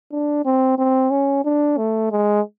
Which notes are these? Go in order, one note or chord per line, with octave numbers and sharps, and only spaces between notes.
D4
C4
C4
C#4
D4
A3
G#3